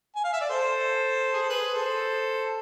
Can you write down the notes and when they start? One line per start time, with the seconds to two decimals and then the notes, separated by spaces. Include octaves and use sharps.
0.16 G#5
0.24 F5
0.33 E5
0.41 D5
0.50 A4 C5
1.33 G#4
1.42 A4
1.49 G#4 B4
1.74 A4 C5